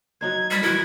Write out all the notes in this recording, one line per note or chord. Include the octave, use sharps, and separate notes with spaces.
F#3 D#4 C5 G#6
G3 C5 B6
E3 E4 F#4 A#4 G#6